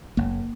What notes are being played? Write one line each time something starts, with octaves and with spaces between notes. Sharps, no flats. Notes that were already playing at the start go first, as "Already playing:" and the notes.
F#1 A#3